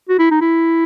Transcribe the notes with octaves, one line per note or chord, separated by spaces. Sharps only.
F#4
E4
D#4
E4